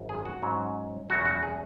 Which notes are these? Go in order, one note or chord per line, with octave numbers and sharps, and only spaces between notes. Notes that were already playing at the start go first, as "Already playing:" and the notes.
Already playing: G#1 F#2 C#3 F#3
G#4
F#4
G#2 F#3 C#4
E2 B2 F#3 C#4 F#4
F#4
G#4